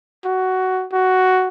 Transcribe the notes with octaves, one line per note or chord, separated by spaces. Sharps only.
F#4
F#4